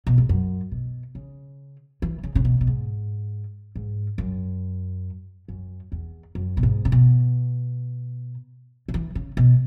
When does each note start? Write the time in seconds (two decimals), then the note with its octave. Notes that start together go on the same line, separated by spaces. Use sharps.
0.07 B2
0.18 G#2
0.29 F#2
0.72 B2
1.15 C#3
2.02 E3
2.23 C#3
2.35 C#3
2.45 B2
2.61 B2
2.67 G#2
3.76 G#2
4.18 F#2
5.48 F#2
5.92 E2
6.35 F#2
6.57 B2
6.63 G#2
6.85 C#3
6.92 B2
8.88 C#3
8.94 E3
9.15 C#3
9.37 B2